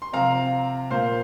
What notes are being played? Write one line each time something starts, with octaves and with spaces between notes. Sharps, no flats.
C6
C3 F3 C4 F5 A#5
A#2 A#3 C5 F5